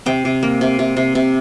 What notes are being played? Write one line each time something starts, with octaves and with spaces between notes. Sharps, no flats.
C3 G5
C3
A#3
C3
C3
C3
C3